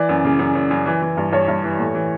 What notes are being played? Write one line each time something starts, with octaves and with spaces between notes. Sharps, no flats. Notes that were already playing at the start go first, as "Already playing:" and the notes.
Already playing: E3 D5
F#2
C#3
F#2
F#2
F#2
E3
E3
G2
G2 C#5
G2
E3
A2
E3